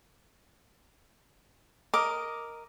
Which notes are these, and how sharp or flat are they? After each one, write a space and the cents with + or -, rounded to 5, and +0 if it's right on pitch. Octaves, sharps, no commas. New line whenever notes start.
A#4 +0 D#5 +5 D6 +0